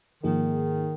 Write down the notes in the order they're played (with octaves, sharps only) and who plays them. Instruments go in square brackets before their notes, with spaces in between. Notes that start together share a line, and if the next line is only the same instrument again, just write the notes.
[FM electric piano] G#2 F3 A#3 D#4 G#4 [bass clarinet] D#3